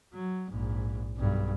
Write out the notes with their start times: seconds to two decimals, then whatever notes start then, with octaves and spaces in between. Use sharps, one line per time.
0.13 F#3
0.49 A#1 G#2
1.16 B1 G2